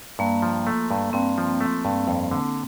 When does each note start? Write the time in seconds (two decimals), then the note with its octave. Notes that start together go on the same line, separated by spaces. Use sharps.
0.19 G2 A#3
0.42 F3
0.67 A3
0.91 G2
1.13 G2 C4
1.38 F3
1.61 A3
1.85 G2
2.08 F2
2.31 D3